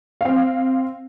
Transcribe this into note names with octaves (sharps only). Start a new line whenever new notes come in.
C4 F5